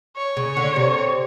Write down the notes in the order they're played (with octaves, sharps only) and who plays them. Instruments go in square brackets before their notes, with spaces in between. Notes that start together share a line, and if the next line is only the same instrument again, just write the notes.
[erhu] C#5
[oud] C#3
D3
C3